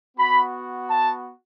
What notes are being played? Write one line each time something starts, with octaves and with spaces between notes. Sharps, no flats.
B3 F#4 B5
A5